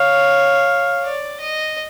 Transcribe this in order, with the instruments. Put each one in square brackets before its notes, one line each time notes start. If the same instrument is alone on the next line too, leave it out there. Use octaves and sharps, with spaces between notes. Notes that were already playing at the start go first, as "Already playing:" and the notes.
Already playing: [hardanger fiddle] C#5 [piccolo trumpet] F5
[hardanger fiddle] D5
D#5